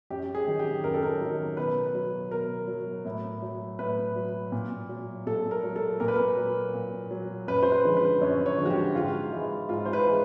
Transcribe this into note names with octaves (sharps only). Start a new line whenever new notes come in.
F#2 G4
G#4
D#3 F#3
G4
F#2 A#4
A4
A#4
D#3 F#3
B2 B4
F#3
B2 A#4
F#3
A2
F#3
A2 B4
F#3
A#2
F#3
A#2 A4
A#4
F#3
A4
A#2 A#4
B4
A#4
F#3
A#2
F#3
F#2 B4
C5
B4
D3 F3 G#3
B4
F#2 C#5
C#5
D3 F3 G#3
F#4
G4
G#2 F4
E3 G#3
G#2 F4
C5
B4
E3 G#3